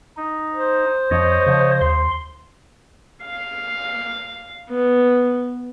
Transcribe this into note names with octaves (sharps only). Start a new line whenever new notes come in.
D#4
C5
F2 F3 C#5 D#5
C#3 F3
D#2 C6
F5
B3